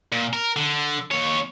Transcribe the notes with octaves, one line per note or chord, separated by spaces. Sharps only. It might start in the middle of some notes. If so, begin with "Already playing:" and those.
A#2
A#4
D3
D#2 C#5